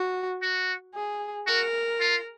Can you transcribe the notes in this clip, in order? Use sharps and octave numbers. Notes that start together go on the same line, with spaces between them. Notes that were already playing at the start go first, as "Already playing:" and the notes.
Already playing: F#4
F#4
G#4
F#4 A#4
F4